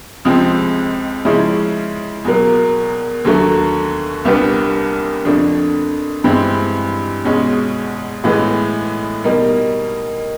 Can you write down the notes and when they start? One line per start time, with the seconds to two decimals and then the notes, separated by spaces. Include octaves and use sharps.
0.25 C#2 C3 F3 G#3 C4
1.25 C#3 F3 G#3 C#4 E4
2.25 E2 B2 F#3 A#3
3.25 D#2 D3 F#3 A3
4.25 C2 A#2 G3 B3 D4
5.25 F2 D3 F3 A3 D4
6.24 G2 E3 G#3 C4
7.24 E2 B2 G#3 C#4
8.24 A2 E3 G#3 B3
9.24 B2 G3 A#3 D#4